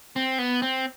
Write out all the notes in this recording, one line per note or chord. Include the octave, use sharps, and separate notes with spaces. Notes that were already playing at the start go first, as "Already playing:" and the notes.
C4
B3
C4